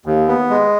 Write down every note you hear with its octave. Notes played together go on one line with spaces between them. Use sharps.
D#2
B3
G#3